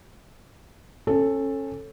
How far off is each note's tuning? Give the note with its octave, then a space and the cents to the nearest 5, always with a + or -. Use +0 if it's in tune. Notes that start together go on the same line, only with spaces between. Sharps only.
C#4 -25 A4 +0